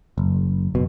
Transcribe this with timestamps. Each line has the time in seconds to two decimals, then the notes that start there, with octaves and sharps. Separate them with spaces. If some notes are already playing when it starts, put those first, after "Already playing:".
0.18 F#1
0.75 F#1 B2